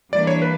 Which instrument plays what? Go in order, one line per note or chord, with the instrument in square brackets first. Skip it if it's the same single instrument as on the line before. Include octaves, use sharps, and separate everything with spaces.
[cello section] E3 G3 A#3 D4 [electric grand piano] D5
[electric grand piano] C#5
B4